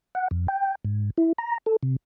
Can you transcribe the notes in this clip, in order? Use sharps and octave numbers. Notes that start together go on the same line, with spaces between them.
F#5
F2
G5
G#2
E4
A#5
A4
C3